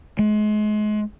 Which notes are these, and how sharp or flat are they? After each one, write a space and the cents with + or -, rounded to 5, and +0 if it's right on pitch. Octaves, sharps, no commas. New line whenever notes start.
G#3 +35